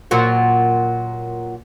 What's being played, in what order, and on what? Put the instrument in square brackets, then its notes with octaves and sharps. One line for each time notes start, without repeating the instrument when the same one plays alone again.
[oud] A#2 F#3 F#4